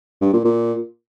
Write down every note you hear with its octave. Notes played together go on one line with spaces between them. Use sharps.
G2
A#2
A#2